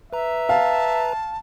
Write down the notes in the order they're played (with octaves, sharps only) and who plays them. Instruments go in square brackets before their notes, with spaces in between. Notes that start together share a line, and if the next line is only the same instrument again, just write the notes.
[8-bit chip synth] B4 A#5 [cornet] E5
[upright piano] F5 [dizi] A5